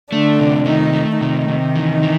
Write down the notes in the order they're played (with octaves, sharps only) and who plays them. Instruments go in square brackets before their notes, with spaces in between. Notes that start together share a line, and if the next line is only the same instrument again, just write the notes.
[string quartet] D3 D4 [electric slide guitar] A3
[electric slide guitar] C3
[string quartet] D#3 D#4 [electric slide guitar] A3
[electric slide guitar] A3
[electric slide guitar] C3 [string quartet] D#3 D#4
[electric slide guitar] C3
E3
E3